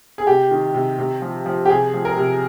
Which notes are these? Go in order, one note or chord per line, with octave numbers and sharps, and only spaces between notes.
G#4
C3 G4
D#3
C3
C3
F3
F3
G4
C3 G#4
F3
A#4
C3